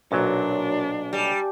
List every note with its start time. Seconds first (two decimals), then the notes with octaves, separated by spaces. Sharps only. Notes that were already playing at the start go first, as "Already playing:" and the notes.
0.12 B1 A#2 F#3 D4 F#4 A#4 C#5
1.13 G3 G#5 A5 D6